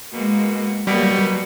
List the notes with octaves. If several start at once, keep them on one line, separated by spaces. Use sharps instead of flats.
B2 G#3 A#3
B2 F#3 G3 A#3